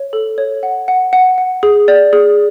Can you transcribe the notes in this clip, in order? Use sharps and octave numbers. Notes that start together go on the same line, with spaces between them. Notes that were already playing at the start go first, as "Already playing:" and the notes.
Already playing: C#5
A4
C#5
F#5
F#5
F#5
F#5
G#4
D5
G#4